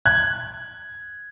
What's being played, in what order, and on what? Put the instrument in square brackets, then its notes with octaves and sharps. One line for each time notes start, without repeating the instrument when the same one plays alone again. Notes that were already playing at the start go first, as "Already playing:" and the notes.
[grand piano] F#6 G#6